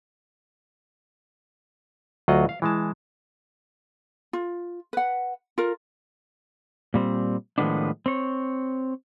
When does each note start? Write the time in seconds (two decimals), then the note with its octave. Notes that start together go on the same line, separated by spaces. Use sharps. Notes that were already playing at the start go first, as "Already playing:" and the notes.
2.28 D2 F#3 F4 D#5 F#5
2.49 F5
2.62 E3 G#3 A5
4.33 F4
4.93 B4 F#5
5.58 F4 A#4
6.94 A#2 G3 C4
7.58 A2 D#3 F3 G#3 B3 D4
8.06 C4 C#5